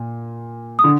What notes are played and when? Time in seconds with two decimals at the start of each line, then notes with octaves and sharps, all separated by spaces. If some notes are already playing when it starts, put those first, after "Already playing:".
Already playing: A#2
0.79 D#6
0.84 D3